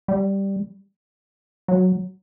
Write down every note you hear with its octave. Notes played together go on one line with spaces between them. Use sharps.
G3
F#3